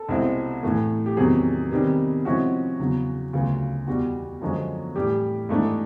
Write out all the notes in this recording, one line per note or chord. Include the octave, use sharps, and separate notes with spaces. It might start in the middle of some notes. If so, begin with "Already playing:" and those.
Already playing: A4
C2 B2 G#3 C4 E4
A2 E3 A3
G4
E2 C3 D#3 F#3 G#4
C3 D#3 G3 B3
C3 F3 G#3 C#4 E4 F#4
E2 C#3 F#3
D2 C#3 F#3 B3 F4
E2 B2 G3 F#4
F#2 D3 F3 G#3 C#4
A2 E3 G3 G4
G#2 E3 A3 D4